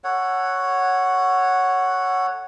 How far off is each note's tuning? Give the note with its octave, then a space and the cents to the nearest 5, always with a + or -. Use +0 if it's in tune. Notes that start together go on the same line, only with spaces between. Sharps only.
A4 +20 C#5 +0 F#5 +0